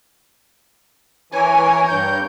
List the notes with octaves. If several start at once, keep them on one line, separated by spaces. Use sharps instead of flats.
E3 A#4 C#5 G#5
G2 G6